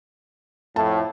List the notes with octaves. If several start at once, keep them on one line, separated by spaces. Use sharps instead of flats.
F2 A2 A5